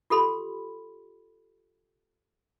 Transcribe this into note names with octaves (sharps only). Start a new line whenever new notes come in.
F4 G4 A4 B5 C6